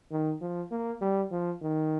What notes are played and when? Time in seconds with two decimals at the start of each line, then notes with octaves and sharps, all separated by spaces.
0.11 D#3
0.41 F3
0.71 A#3
1.01 G3
1.31 F3
1.61 D#3